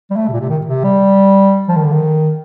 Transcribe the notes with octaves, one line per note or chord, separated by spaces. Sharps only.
G3
A3
C3
A#2
C3
D#3
C3
G3
F3
D#3
D3
D#3